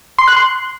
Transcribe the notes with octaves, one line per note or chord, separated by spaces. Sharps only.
C6
F#6
C6